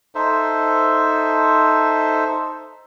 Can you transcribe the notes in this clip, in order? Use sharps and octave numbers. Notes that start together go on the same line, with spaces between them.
D#4 A4 C5 E5